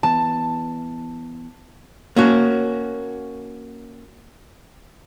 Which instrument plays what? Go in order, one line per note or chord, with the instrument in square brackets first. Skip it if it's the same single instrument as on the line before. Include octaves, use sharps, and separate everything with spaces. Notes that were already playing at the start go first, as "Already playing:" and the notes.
[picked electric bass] E3 B3 [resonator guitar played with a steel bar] A5
[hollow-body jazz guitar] A#3 C#4 F#4